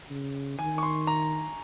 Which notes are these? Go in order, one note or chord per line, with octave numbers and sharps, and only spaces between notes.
C#3
D#3 G#5
C#6
C6
A#5